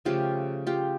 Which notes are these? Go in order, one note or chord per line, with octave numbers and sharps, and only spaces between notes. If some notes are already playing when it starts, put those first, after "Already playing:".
C#3 F3 A3 F4 G4
F4 G4